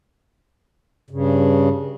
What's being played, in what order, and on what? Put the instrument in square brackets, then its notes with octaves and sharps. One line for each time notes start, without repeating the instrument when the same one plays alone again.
[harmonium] G2 C#3